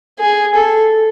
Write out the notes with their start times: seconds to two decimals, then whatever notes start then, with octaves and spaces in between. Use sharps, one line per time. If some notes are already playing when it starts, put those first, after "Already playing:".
0.20 G#4
0.55 A4